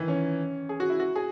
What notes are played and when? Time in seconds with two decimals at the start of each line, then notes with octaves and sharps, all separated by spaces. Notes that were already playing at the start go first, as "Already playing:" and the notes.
Already playing: D#3 E3
0.08 C#4
0.69 G#4
0.80 F#4
0.90 E4
1.00 F#4
1.16 G#4